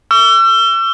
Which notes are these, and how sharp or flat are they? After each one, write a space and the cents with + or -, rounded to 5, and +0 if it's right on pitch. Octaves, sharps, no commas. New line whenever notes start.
C#6 +45 E6 +40